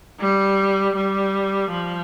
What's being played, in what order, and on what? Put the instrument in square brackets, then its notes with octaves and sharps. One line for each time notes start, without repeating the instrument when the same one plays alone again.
[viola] G3
G3
F3